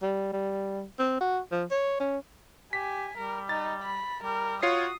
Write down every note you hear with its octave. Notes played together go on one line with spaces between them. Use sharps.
G3
G3
C4
F#4
F3
C#5
C#4
G4 G#5 B6
G3 A#4
D#4 A6
B5
G3 A#4
F4 F#4 C#5 D#6 C7